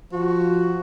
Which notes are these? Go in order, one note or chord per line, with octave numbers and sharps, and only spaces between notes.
F3 F#4